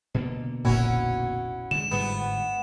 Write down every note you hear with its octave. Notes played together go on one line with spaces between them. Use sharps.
B2 D3 A#3
F1 A#1 A#2 C#4 E4 F#4
D3 G#3 E7
G1 G#2 G3 B3